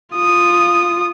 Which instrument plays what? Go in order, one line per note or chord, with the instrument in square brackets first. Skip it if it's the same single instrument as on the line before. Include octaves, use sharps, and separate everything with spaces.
[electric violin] F4 D#6